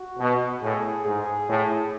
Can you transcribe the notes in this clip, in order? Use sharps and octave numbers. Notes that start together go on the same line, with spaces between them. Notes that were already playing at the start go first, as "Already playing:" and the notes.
Already playing: F#4
B2
A2 G#4
G#2 G#4
A2